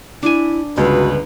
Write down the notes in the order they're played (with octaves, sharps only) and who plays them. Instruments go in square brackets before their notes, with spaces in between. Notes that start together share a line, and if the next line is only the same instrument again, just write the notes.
[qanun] D4 G#5 [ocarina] E4
[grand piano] G1 C#2 [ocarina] F#4 [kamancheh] B4